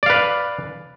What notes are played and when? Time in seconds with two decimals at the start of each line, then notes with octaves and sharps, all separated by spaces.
0.03 D5
0.06 F5
0.10 B4